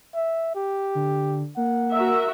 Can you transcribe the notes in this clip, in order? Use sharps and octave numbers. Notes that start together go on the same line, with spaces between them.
E5
G4
D3
A#3 F#5
F#4 A#4 E5